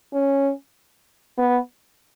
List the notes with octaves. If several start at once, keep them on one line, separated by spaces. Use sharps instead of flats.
C#4
B3